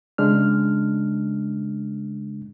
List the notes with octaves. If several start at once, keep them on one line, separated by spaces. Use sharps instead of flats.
C#3 G#3 D4 F6